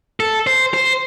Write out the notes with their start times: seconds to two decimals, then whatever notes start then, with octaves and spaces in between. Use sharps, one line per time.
0.20 A4
0.47 C5
0.74 C5